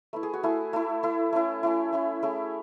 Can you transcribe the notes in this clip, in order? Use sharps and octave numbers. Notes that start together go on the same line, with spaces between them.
A3 E4 B4
G#4
F#4
A3 E4 G#4
A3 E4
A3 E4
A3 C#4 E4
A3 C#4 E4
A3 C#4 E4
A3 C#4 E4 G#4